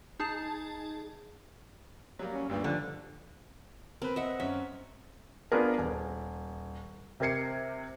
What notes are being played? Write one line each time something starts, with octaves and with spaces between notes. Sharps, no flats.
D#4 G#4 A5
F#3 G3 A#3
C#4
D2 G2 A#2 G3
D3 F3
C4 A#4 B4
D#5 E5 F#5
F#2 C#4 E5
B3 D4 F4 G#4 A#4
D#1
C3 G4 A#4 G#6 C7 C#7